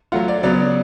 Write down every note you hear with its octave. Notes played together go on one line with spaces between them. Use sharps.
F#3 A3 F4 F#5
D5
C#3 F#3 B3 D5